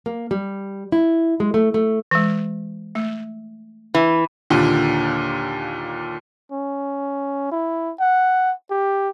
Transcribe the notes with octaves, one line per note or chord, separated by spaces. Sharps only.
A#3
G3
E4
G#3
A3
A3
E3 G#3
A3
E3
D#2 A#2 D3
C#4
E4
F#5
G4